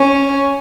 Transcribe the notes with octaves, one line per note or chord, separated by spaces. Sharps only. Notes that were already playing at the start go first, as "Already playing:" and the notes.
Already playing: C#4